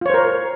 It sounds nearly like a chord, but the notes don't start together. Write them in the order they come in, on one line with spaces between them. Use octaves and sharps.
F4 C#5 C5 A#4